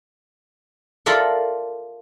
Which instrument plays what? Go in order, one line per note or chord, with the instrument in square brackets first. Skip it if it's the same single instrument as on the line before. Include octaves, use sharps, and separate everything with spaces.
[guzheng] F4 A4 A#4 D5 E5 F#5